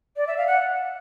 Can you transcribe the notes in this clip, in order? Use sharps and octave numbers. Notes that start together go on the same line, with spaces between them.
D5
E5
F5
F#5